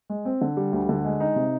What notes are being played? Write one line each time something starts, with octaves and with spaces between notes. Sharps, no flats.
G#3
C4
D3
G3
D2
D3
G#3
D#4
C3